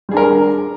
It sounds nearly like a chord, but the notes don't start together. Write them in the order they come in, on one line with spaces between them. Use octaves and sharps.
G3 G#4 D4 A#4